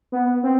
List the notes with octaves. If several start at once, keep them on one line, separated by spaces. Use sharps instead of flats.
B3
C4